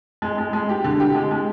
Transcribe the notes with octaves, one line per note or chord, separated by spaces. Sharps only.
G#3
G#3
G#3
G4
D3
G4
G#3
G#3